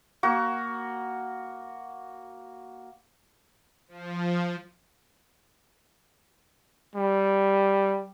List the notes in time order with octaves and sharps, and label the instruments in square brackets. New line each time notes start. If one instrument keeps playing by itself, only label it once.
[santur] A#3 F#4
[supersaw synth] F3
[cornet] G3